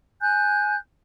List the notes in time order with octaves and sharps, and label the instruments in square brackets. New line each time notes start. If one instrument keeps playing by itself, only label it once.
[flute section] G#5 F#6 G6